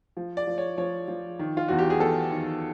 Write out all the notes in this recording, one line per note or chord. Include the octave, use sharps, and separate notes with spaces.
F3
D5
F3
C#5
F3 C#5
F3
D#3
F4
E2 F#4
G4
G#4
E2 A4
D#3